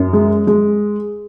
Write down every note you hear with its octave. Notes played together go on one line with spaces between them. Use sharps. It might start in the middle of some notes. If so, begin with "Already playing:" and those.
Already playing: F#2
G#3
G#3